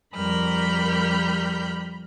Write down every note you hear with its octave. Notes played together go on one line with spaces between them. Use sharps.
F2 G3 A#4 B5 F6 G6